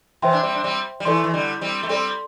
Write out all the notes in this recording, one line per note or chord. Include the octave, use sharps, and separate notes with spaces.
C3 E3 C5 E5 G5 C6
D4
G3 C4
D4
G3 C4
G3
E3 A3 E4 A4 D5 C6
E3
D3 G3
G3 C4
A3
G3 C4 A4 D5 C6